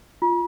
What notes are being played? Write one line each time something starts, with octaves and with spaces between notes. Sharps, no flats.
F4